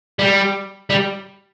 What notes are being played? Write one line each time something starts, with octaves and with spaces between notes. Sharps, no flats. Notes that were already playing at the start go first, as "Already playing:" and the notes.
G3
G3